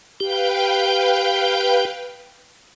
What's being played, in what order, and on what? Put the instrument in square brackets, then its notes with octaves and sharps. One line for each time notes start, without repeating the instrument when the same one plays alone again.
[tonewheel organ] G4 [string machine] B4 F5 G5